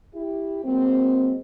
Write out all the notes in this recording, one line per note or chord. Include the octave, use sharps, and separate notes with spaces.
E4 G4
F#3 G#3 A#3 C4